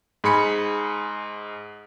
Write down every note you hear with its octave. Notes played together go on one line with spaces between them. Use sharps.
G#2 G#4 B5 C#7